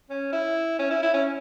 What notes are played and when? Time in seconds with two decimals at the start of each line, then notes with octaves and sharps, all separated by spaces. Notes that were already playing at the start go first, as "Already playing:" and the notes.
0.10 C#4
0.33 E4
0.79 C#4
0.90 E4
1.02 E4
1.14 C#4